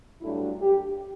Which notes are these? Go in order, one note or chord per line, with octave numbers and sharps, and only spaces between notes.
G2 F#3 A3 D4 E4
G4